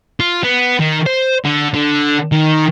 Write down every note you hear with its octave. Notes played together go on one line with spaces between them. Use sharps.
F4
B3
D#3
C5
D3
D3
D#3